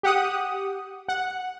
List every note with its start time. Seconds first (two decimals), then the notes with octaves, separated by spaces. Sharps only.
0.03 G4 F#5 D#6
1.08 F#5